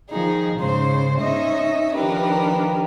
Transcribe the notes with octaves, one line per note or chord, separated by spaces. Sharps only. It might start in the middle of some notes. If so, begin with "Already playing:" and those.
D#3 F3 D#4 G#4
G#2 C#3 C5 C6
C#4 D#4 D#5 E5
D#3 F3 D4 G4 A#4 B4